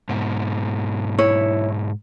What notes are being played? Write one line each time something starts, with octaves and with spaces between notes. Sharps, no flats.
G#2 B2
E4 C#5